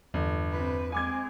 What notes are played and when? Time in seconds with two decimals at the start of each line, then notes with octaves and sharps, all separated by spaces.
0.14 G1 E2
0.52 C4 B4
0.92 G#3 C4 G#5 D6 G#6